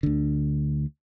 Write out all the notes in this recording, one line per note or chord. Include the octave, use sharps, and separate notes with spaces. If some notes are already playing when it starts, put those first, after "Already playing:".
D2 D3